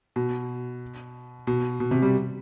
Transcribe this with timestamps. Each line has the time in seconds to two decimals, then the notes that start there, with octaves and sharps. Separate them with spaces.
0.16 B2
1.47 B2
1.80 B2
1.91 C3
2.02 G3